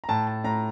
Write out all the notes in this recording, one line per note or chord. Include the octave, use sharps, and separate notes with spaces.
A#5
A2 A5
A5
A2 A#5